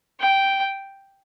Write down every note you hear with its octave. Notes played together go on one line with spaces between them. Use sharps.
G5